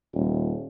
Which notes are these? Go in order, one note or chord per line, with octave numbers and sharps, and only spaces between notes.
D#1